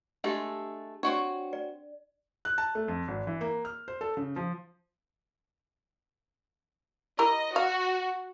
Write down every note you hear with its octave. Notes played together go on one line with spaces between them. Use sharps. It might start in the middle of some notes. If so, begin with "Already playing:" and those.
G#3 A3 D4 G4 A4
C4 D4 F#4 C#5 D5
D5
F#6
A5
A3
F2
G#1
E3
A#3
F6
C5
A4
C#3
F3
E4 G4 A#4 D#5
F#4 F5